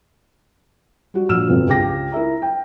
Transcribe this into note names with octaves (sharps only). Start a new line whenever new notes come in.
G3 F#4
A#1 F#4 E6 F6 E7
G1 F2 B2
C#2 G4 G#4 G5 D6 A#6
E4 A#4 E5 A#5
G5